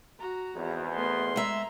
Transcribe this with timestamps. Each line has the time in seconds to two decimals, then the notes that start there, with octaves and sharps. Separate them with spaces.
0.20 F#4 A#5
0.55 G#1 E2
0.95 A3 B3 C6
1.36 G#3 E5 A#5